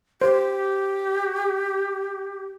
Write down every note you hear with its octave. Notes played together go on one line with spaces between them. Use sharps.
G4 C5